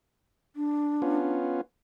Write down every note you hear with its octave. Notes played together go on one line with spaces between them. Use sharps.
D4
B3 C#4 F4